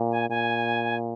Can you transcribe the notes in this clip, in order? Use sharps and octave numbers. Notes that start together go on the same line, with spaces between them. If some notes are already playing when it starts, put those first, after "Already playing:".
Already playing: A#2
G#5
A#2 G#5